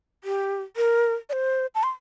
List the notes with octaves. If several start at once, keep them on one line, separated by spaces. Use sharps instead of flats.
G4
A#4
D5
C5
A5
C6